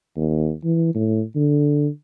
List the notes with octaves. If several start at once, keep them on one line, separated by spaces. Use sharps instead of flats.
D#2
E3
A2
D3